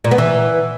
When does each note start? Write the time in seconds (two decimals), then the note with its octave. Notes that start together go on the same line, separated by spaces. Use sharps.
0.04 A#2
0.11 B3
0.18 E3